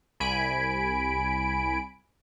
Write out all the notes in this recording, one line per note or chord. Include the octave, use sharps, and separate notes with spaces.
C2 G#5 B5 D7